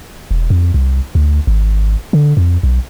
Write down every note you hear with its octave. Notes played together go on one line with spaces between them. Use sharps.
E1
F2
C2
D2
G#1
D3
F2
B1